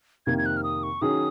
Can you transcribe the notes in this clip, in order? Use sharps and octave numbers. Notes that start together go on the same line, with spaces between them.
F2 C3 D#3 A#3 G#6
G#6
F#6
F6
D#6
C#6
D#3 F#3 C#4 G#4 D#6